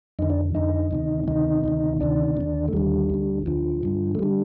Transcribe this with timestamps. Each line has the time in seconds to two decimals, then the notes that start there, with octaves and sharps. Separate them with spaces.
0.19 F2 D3 D#4
0.30 D4
0.54 F2 D3 D#4
0.91 D2 C3 D#3
1.28 D2 C3 D#3 D#4
1.64 D2 C3 D#3
2.00 D2 C3 D#3 D4
2.37 D#2 D3
2.68 A3
2.73 D#2 D3 G3
3.10 D2 D3
3.46 D2 D3 F3
3.83 G2 D3
4.15 A3
4.19 D3 G3